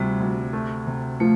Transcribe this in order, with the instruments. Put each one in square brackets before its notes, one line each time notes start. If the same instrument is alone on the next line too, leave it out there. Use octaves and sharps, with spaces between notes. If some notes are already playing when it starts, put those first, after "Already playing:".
Already playing: [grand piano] D2 C3 F3 [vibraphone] G3
[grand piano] D2
A3
C3
[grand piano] F3 [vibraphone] A3